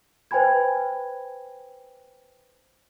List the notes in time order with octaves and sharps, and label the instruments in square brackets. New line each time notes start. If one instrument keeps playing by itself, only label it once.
[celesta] B4 C5 G5 G#5 B5 G#6